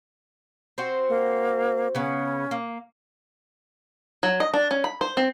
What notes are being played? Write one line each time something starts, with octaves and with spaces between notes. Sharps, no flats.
C4 F#4 C5
A#3
C#3 B3 C#4
A#3
F#3
D#5
D4
C#4
B5
C5
C4